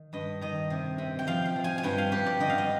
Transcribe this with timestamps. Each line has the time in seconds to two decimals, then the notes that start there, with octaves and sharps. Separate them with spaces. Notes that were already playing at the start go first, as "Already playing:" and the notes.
Already playing: D#3
0.13 G2 D#5
0.41 D#3 D#5
0.70 C3
0.98 C3
1.19 G5
1.27 F3 F5
1.46 F5
1.56 F3
1.64 G#5
1.78 G#5
1.83 G2 G5
1.98 F5
2.12 G2 G4
2.27 D5
2.40 D3 D#5
2.50 F5
2.58 D#5